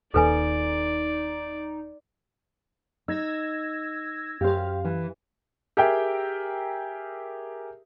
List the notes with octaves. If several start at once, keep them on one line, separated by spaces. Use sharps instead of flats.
D#1 D#2 D#4 A4 B4 D5 G#5
D#4 E6 G#6 A#6
F#2 G4 C5 F5
E3
G4 G#4 A#4 E5 G5